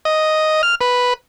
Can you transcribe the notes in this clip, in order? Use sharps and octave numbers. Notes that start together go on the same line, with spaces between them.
D#5
F6
B4